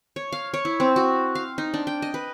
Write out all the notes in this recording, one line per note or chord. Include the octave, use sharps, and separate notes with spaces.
C#5
F5
C#5
E4
C4
F#4
F5
D#4
D4
G5
D#5
B4